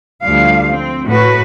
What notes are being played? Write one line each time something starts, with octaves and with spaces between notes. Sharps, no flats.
D2 F3 G3 F5
C4
A2 F#4 B4